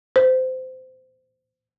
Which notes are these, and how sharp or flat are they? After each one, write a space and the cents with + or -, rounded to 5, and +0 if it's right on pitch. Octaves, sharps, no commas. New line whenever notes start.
C5 -20